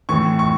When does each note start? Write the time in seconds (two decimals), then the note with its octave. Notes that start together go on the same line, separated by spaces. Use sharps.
0.09 A2 E3 C#6
0.39 C#6